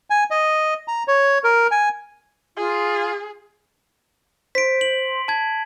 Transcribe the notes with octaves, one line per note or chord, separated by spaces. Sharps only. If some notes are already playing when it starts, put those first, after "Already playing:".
G#5
D#5
A#5
C#5
A#4
G#5
F4 G#4
C5 B6 D7
F#7
A5 G#6